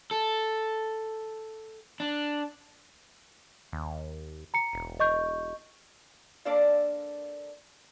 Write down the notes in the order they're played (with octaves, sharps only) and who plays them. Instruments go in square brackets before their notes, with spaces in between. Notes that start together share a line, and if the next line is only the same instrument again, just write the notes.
[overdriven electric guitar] A4
D4
[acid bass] D#2
[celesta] A#5 C#7
[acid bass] E1
[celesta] D#5 C#6 G6
[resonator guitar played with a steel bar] A#3 D4 A4 C5 D5 F5